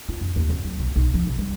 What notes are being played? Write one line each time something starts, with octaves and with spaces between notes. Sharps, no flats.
F4
F#2
D#2
F#2
F#3
B1
B1
F3
B2
G3